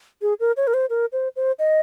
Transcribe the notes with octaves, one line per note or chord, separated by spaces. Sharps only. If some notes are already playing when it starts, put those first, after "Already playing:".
G#4
A#4
C#5
A#4
C5
A#4
C5
C5
D#5